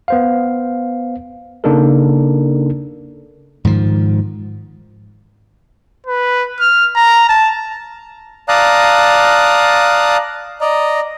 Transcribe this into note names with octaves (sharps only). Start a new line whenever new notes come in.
B3 C5 F5
C#3 A#3 D4 D#4 A4 A#4
G#2 D#3 F3
B4
F6
A#5
A5
D5 F5 A5 A#5 D#6 F#6
D5 D#5 A#5